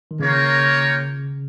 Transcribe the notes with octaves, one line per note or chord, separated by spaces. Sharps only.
D#3
C#3 A#3 F4 A#4 C#5 G5